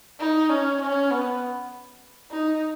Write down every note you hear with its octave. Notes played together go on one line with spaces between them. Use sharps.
D#4
C#4
C#4
B3
D#4